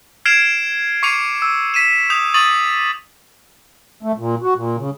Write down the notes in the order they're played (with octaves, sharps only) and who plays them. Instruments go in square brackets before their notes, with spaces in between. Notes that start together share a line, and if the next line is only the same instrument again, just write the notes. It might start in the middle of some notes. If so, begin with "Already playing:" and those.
[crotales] F6 G#6 C7 D7 E7 F7
C#6 D6 C7 C#7 D#7 F7
E6
B6 D#7 E7
D#6 G6 F7
C#6 D#6 A6 D#7 F#7
[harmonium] A3
A#2
F#4
A#2
C#3